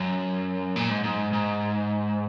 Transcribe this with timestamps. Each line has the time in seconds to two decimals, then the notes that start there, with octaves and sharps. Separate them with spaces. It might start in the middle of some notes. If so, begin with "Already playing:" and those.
Already playing: F#2
0.76 A#2
0.90 G#2
1.04 G#2
1.33 G#2